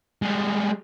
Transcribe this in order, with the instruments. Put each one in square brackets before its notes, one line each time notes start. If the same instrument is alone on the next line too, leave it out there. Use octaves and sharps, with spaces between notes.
[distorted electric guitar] G3 G#3